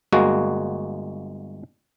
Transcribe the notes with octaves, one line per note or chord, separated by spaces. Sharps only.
G1 G#3 A#3 F#4